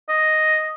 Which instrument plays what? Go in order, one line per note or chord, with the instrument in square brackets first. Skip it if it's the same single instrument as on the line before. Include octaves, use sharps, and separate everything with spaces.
[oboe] D#5